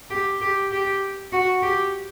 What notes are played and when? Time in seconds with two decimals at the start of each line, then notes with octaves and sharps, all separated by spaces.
0.10 G4
0.41 G4
0.71 G4
1.32 F#4
1.62 G4